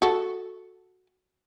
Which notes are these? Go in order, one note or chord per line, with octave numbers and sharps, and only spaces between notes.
F#4 A4